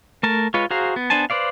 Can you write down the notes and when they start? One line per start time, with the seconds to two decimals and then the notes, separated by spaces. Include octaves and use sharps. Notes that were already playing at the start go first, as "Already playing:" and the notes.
0.23 A3 A#4 A5
0.54 G#3 F4 B4 C#5
0.71 F#4 G#4 C5 F5 A#5
0.96 B3
1.10 B3 D4 C5 G#5 A5
1.30 B4 C5 D5 F5